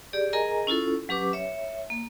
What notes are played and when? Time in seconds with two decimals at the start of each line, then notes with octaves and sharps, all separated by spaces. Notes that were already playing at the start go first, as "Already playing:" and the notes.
0.13 G4 G#4 D5
0.33 G#4 A#4 D#5 G#5 A#5
0.67 C#4 E4 F4 A4
1.09 F#3 C#4 G4 B4 D6
1.33 C#5 E5
1.90 A#3